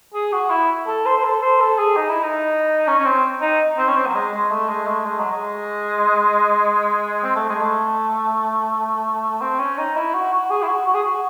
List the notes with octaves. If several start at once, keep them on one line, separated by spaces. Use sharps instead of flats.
G#4
F#4
E4
A4
C5
C5
A4
C5
A4
G#4
D#4
E4
D#4
C#4
C#4
C4
D#4
C4
C#4
C4
F#3
G#3
G#3
A3
G#3
A3
G#3
F#3
G#3
C4
A3
G#3
A3
C4
C#4
D#4
E4
F#4
F#4
G#4
E4
F#4
F#4
G#4
F#4